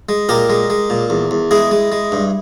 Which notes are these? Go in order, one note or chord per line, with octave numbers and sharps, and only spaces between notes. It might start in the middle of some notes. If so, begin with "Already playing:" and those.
G#3
A#2 G4 A#4
G#3
G#3
A#2
E2
E2
G#3 E4 G#4
G#3
G#3
G2